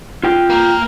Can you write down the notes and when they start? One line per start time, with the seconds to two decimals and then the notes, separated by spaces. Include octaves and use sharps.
0.24 F4 G5
0.50 A#3 A#4